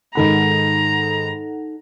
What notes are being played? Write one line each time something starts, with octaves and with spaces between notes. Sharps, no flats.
G#2 D#3 D#4 A4 F#5 A#5 B5